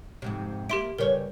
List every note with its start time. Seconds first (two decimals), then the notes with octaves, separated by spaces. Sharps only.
0.22 F2 G#2 C3
0.69 A#3 E4 G4 C6 D7
0.99 C#3 G3 A#4 B4 C#5